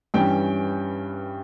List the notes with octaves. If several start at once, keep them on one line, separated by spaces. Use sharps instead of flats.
G2 E3 G3 C#4 G5